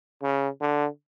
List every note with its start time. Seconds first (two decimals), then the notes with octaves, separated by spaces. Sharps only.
0.23 C#3
0.61 D3